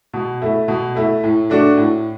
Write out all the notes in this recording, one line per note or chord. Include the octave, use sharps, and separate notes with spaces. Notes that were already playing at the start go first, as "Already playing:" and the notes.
B2
A3 E4
B2
A3 E4
A2
A3 D4 F#4
A2